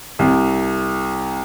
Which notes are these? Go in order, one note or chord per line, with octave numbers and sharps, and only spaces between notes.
C2